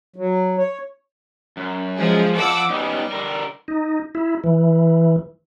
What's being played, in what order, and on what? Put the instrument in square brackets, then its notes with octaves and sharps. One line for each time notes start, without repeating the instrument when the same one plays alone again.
[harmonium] F#3
C#5
[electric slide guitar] F#2
[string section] F3 G#3 G#4
[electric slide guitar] F3 A4 [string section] F#5 D6 E6
[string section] G3 [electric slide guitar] B3 C#4 D#4
[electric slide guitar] D3 A#4
[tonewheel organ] D#4
E4
E3